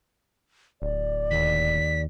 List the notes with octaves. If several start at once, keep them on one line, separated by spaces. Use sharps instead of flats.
D1 D5
D#2 B6